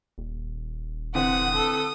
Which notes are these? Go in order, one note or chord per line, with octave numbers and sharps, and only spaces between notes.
D#1
D3 E3 C4 F#5 D#6
A4